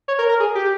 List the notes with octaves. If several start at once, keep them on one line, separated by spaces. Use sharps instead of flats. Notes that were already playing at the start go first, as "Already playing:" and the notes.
C#5
A#4
A#4
G#4
G4